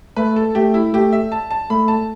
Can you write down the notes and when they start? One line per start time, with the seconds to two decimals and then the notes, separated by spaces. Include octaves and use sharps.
0.16 A3 B4
0.36 A4
0.55 A3 G4
0.74 E4
0.93 A3 G4
1.13 E5
1.32 A5
1.51 A5
1.70 A3 B5
1.88 A5